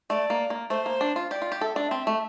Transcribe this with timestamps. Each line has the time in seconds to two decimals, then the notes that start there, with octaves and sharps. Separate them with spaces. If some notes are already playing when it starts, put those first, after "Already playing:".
0.10 A3 D5
0.30 A#3
0.50 A#3
0.70 A3 C5
0.86 A#3
1.01 D4
1.16 F4
1.31 G4 D5
1.42 F4
1.52 G4
1.61 A4 E5
1.75 D4 D5
1.89 C4 E5
2.07 A3